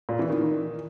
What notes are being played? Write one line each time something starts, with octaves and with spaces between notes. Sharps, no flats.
A#2
E3
D#3